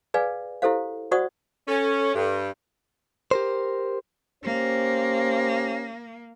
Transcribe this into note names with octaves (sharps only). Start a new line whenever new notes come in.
G#4 B4 D5 F5 G#5
E4 G4 A4 C5 F5
F#4 C5 D5 F#5 C#6 D#6
C#4 A4
G2
G4 A#4 C5
A#3 C#4 G4 C5